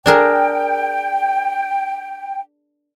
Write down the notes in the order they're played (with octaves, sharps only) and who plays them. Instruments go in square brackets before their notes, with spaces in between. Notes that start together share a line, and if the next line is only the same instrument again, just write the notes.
[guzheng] D4 G#4 A#4 [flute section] G5